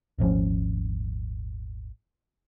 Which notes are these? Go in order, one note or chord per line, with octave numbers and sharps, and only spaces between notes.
D#1 G#1 F3 C#4